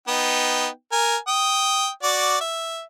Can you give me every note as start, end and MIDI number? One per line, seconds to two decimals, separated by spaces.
0.08 0.68 59
0.08 0.68 63
0.08 0.68 79
0.92 1.17 70
0.92 1.17 80
1.28 1.88 79
1.28 1.88 87
2.03 2.36 66
2.03 2.36 74
2.03 2.36 86
2.41 2.82 76